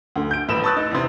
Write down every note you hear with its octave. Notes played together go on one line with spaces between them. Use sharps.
D2 D3
G6 D7
D#1 A1 B4 B5 E7
A5 C#6 D#6 E6 F#6 A6
D#4
E2 C3